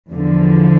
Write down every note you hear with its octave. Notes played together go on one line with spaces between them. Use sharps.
E2 D3 F3